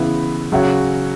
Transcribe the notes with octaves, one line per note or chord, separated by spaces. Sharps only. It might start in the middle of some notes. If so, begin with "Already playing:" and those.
Already playing: C#3 E3 B3 E4
C#3 F#3 C#4 F#4